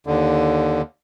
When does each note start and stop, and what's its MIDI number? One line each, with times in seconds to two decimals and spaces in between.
0.07 0.82 39
0.07 0.82 50